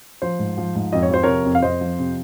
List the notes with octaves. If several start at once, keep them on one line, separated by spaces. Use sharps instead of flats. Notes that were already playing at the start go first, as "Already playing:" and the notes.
F3 C5
G#2
F3
G#2
F2 D#5
C#5
F3 C5
C3 A#4 C#5
F2
F5
F2 C5 D#5
F3
C3